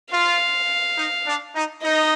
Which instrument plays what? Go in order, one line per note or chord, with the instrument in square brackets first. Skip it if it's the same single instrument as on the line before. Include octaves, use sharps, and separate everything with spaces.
[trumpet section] F4 [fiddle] F5
[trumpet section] D#4
D4
D#4
[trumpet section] D#4 [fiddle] D#5